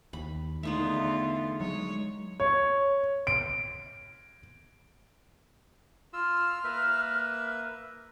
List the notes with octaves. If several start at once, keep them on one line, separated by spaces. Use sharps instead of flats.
D#2 B5
E2 D3 A3 B3 D#4 F4 E5
F#3 G#3 C#5
C#5
D7
F4 E6 F6
A#3 B4 E5